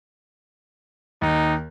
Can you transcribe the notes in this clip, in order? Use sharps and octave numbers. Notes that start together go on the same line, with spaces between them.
D#2 D#4